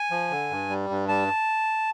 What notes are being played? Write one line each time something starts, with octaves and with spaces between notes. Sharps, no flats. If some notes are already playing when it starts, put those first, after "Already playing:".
Already playing: G#5
F3
D3
G2
G3
G2
G3 A5